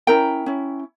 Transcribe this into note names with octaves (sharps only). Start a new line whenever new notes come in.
C#4 E4 A#4 G5 A#5
C#4 E4